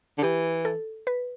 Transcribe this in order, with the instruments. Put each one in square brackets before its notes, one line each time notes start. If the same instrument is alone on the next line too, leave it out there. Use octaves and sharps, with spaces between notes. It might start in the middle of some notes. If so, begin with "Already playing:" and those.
[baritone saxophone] D3
[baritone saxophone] E3 [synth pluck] G4
[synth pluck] A4
B4